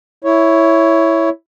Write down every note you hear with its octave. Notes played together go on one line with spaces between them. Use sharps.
E4 C#5